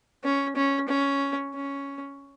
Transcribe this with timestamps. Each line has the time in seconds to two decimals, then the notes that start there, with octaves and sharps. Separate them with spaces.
0.24 C#4
0.56 C#4
0.88 C#4
1.54 C#4